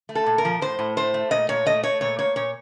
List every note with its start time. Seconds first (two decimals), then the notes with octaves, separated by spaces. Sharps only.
0.09 A3
0.15 A4
0.26 A#2
0.38 A#4
0.45 F3
0.61 A2 C5
0.79 A2
0.97 A3 C5
1.14 A3
1.31 A#2 D#5
1.49 A#2 C#5
1.66 A3 D#5
1.83 A3 C#5
2.01 A#2 C#5
2.19 A#3 C#5
2.36 A#2 C#5